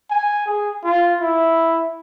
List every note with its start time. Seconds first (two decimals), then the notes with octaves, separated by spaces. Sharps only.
0.10 G#5
0.46 G#4
0.84 F4
1.20 E4